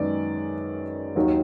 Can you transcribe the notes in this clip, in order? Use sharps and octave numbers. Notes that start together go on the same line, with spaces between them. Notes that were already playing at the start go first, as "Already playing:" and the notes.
Already playing: F#2 D#3 G#3 B3 D5
D#2 D#3 F#3